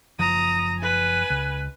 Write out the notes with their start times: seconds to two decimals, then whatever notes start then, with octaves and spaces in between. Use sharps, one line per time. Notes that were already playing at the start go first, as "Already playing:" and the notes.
0.19 F#1 F3 A#5 D#6
0.79 B4 G#5
1.30 C#2